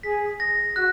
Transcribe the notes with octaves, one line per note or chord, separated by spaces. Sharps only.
G#4 B6
A#6
F#4 F#6